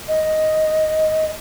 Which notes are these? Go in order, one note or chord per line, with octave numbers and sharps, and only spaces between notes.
D#5